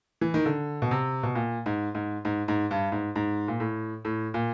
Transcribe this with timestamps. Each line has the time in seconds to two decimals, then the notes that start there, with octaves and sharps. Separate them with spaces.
0.21 E3
0.34 D#3
0.46 D3
0.82 B2
0.91 C3
1.23 B2
1.35 A#2
1.66 G#2
1.95 G#2
2.25 G#2
2.48 G#2
2.71 G2
2.92 G#2
3.16 G#2
3.48 A#2
3.60 A2
4.05 A2
4.34 A#2